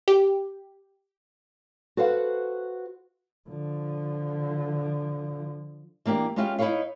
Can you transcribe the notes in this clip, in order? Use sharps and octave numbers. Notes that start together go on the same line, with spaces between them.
G4
F#4 A4 B4 C5 F5 F#5
D3 F3
E3 A#3 D4 G4
G#3 B3 C#4 F4 G4 E5
D#4 E4 A4 B4 C#5 F5